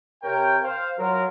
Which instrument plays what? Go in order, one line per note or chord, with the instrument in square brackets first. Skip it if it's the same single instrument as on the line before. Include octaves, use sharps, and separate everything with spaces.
[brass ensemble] C3 A#4 C#5 G5
C5 F5
F#3 F4 A#4